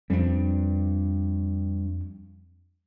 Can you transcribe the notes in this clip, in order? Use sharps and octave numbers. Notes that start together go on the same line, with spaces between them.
F2 G3 D4